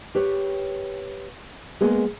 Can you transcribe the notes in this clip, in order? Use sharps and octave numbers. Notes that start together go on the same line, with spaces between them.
G4 B4 C#5
G#3 A#3 B3 G#4